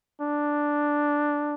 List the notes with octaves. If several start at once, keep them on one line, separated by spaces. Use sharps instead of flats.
D4